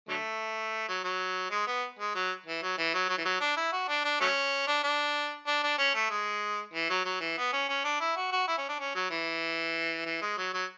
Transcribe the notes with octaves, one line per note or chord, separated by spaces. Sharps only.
D3 F#3 A3
F#3
F#3
G#3
B3
G#3
F#3
E3
F#3
E3
F#3
F#3
E3
F#3
D4
E4
F#4
D4
D4
F#3 A3 C#4
D4
D4
D4
D4
C#4
A3
G#3
E3
F#3
F#3
E3
B3
C#4
C#4
D4
E4
F#4
F#4
E4
C#4
D4
C#4
F#3
E3
E3
G#3
F#3
F#3